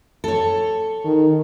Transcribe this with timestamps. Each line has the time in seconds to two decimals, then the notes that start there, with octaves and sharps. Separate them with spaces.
0.24 A4 C#5
1.05 D#3